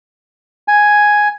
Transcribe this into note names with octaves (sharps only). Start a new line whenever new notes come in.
G#5